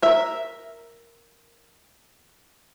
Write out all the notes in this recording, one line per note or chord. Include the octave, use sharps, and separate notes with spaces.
A#4 E5